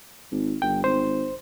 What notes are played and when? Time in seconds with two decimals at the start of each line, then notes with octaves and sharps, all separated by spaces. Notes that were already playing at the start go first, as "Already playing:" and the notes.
0.31 G#1
0.62 G1 G5
0.84 G#1 C5